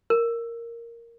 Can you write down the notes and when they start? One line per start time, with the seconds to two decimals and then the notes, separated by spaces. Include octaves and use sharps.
0.10 A#4